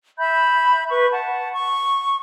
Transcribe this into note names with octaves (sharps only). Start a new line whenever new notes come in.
E5 B5 G6
B4 C#6
F#5 A5
C#6